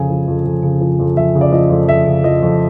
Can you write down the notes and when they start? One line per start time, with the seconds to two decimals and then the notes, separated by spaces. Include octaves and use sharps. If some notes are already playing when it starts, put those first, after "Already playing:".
Already playing: F2 C#3 G#5
0.10 F3
0.28 F2
0.45 F2
0.63 C#3
0.81 F3
0.99 F2
1.17 F2 E5
1.35 C#3
1.41 D5
1.52 F3 D#5
1.70 F2
1.88 F2 E5
2.06 C#3
2.24 F3 D#5
2.42 F2